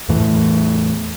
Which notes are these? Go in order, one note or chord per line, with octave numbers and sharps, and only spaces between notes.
E2 A2 E3 A3